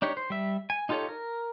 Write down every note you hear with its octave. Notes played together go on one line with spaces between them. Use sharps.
D4 D#4 G4 C#5
C5
G3 E5
G#5
D#4 F4 G4 A4 C#5
A#4